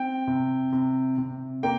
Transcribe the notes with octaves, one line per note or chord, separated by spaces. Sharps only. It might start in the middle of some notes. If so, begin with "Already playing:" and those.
Already playing: C4 G5
C3
C3
C3
A#3 G5